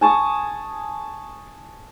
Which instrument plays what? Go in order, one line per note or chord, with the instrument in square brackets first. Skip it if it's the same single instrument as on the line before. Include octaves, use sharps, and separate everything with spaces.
[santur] G#5 A5 C#6 D#6